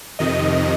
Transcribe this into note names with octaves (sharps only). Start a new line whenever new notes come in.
F2 C3 D#3 D#5